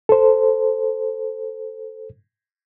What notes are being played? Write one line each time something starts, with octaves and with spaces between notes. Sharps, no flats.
A4 C5